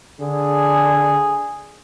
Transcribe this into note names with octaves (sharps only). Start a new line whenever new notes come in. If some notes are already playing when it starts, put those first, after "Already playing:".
D3 G#4